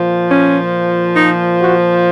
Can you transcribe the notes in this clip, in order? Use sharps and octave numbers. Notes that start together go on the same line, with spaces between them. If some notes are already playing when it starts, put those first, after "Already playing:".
Already playing: A#2 F3
C#4
D#4
F#4